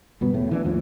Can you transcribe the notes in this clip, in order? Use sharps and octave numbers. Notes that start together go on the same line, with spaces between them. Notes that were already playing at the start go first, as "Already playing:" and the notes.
G1 G2 B2 B3
E2 A2
E3 C4 D4
D#2 A2 F3